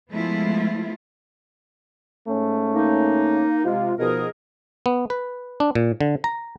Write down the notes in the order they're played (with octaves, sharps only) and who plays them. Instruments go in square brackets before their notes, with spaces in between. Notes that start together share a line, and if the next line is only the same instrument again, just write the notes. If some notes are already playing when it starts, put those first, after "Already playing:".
[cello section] F3 G#3 A3 B3 E4 F4
[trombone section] G#2 A3 C#4
[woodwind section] A#3 D#4
[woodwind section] C3 G#3 [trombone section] F4
[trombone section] B2 F3 [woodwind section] D#4 G#4 A#4
[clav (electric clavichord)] B3
B4
D4
A#2
D3
A#5